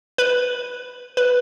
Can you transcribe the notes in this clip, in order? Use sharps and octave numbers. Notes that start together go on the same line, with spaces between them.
B4
B4